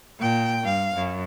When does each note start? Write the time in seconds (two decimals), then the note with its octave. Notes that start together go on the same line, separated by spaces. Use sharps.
0.19 A#2 G5
0.64 G2 F5
0.95 F#2